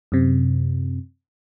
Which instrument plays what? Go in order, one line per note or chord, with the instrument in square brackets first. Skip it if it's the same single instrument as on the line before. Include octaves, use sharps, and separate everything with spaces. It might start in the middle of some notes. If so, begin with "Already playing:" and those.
[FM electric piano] F#2 C3